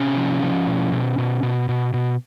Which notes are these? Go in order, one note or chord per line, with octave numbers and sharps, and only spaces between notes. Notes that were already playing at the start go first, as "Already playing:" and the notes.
Already playing: C3 C#4
F3
F3
B2
B2
B2
B2
B2
B2